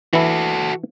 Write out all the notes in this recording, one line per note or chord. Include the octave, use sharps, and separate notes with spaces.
E3 E4 F#4 A4